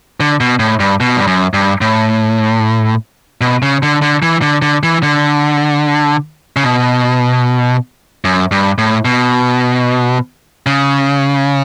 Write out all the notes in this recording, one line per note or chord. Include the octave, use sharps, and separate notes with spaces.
D3
B2
A2
G2
B2
G2
F#2
G2
A2
B2
C#3
D3
D3
E3
D3
D3
E3
D3
C#3
B2
F#2
G2
A2
B2
C#3